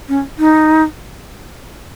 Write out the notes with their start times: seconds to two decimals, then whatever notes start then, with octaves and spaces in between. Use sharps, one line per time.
0.09 C#4
0.39 D#4